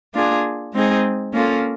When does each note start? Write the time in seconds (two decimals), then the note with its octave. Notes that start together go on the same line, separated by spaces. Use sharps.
0.14 A#3 D4 F4 G#4
0.73 G#3 C4 D#4 G#4
1.33 A#3 C#4 F4 A4